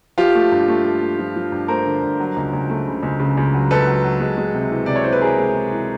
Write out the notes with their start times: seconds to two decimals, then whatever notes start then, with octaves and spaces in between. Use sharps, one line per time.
0.18 F3 F4 G4
0.35 A3
0.52 G2
0.68 A3
0.85 A3
1.01 A3
1.19 F3
1.36 F3
1.52 G2
1.68 A3 A#4 C5
1.85 D3
2.02 G2
2.20 F#3
2.36 C#2
2.53 C#2
2.70 A3
2.87 C#3
3.03 C#2
3.19 C#3
3.37 C#2
3.54 F#3
3.71 C#2 A4 B4
3.87 F#3
4.04 F#3
4.20 G#3
4.37 G#3
4.54 C3
4.71 E3
4.86 C3 D5
4.96 C#5
5.04 E3 C5
5.12 B4
5.21 E3 G#4 A#4
5.38 G#3
5.54 G#3
5.72 E3